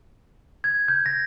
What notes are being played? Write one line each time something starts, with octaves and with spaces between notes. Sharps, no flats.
G#6
G6
A#6